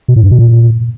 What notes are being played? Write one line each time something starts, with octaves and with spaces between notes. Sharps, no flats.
B2
A2
G2
B2
A#2